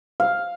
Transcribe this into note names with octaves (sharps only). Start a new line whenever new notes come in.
F5